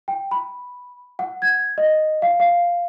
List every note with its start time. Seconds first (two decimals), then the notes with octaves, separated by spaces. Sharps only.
0.08 G5
0.31 B5
1.19 F#5
1.42 G#6
1.78 D#5
2.22 F5
2.40 F5